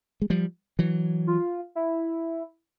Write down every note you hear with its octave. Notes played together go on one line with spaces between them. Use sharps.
G#3
F3 G3
E3 F#3
F4
E4